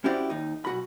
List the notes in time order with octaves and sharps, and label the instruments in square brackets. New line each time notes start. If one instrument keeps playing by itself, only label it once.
[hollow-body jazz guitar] C#4 E4 F#4 G4 C5 D5
D#2 D#4
B1 F#4 B5